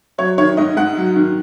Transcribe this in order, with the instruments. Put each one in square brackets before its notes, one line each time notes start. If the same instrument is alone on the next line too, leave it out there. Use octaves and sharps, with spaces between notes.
[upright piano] F#3 C#5
D#3 C#5
G#2 D#5
G#2 F#5
F#3
D#3